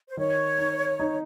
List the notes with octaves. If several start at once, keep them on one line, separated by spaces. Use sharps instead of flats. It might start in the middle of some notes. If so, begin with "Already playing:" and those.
C5
D#3 C#5
D#4
D#4